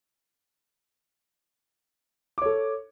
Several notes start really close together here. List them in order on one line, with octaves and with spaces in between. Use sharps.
D6 C#5 A4